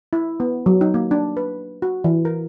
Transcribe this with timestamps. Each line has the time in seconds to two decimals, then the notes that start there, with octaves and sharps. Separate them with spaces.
0.13 E4
0.40 B3
0.66 F#3
0.81 D#4
0.94 A#3
1.11 D4
1.37 B4
1.82 F#4
2.04 E3
2.25 A#4